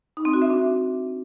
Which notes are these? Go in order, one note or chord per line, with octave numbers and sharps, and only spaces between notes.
D#4
C4
F#4
E5
D4